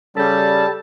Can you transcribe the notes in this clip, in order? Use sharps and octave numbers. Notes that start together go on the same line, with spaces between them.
C#3 G3 A4 A5 G6